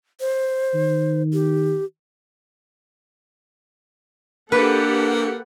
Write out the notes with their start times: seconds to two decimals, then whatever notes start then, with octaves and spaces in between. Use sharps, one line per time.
0.20 C5
0.75 D#3
1.33 G4
4.52 A#3 D4 G4 A4 B4 F#5